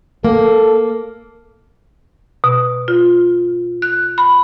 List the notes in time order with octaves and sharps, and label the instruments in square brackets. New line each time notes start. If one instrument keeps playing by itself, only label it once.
[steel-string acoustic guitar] A#3 [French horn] A4
[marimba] B2
F4
F#6
B5